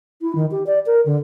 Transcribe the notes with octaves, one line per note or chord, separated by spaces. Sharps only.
E4
D#3
G4
D5
A#4
D3